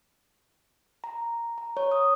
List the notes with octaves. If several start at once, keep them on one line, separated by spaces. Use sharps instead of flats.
A#5
A#5
C#5
D#6